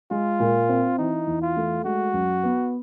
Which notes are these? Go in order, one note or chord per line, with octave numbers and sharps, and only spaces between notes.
G#3 F4
A#2
C4
E3 D#4
E2
F4
A3
G#3 F#4
F#2
B3